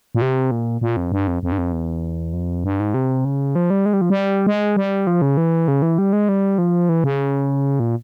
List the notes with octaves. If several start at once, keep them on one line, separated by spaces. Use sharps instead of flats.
A#2
C3
A#2
A#2
F2
G2
F2
F2
G2
F2
E2
F2
G2
G#2
C3
C#3
F3
G3
G#3
G3
F3
G3
G#3
G3
F3
C#3
E3
C#3
E3
G3
G#3
G3
F3
E3
C#3
A#2